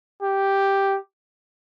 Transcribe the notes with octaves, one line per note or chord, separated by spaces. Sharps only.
G4